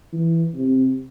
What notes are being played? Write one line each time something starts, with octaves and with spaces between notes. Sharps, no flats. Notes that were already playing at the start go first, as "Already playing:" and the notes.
E3
C3